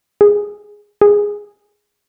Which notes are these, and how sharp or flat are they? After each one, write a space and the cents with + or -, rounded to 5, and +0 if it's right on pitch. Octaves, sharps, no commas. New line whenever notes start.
G#4 +0
G#4 -5